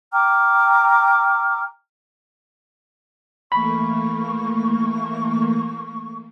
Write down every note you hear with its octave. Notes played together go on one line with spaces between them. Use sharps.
G5 A#5 D6 F6
E3 A3 A#3 B5 C#6